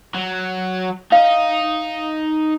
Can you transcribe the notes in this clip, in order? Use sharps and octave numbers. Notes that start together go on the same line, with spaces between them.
F#3
D#4 D#5 F5